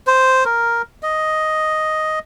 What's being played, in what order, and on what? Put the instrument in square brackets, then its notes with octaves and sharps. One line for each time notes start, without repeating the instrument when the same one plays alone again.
[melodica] C5
A#4
D#5